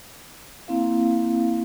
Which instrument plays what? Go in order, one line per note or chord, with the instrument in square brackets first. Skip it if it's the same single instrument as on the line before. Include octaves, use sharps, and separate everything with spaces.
[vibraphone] A#3 C4 E4 F5